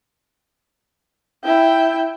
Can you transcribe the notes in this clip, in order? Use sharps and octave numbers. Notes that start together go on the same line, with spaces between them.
E4 G5